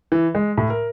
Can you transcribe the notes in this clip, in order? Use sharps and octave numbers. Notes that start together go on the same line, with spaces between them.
E3
G#3
A2
A#4